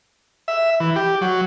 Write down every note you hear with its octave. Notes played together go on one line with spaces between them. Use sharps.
E5
E3
G4
F#3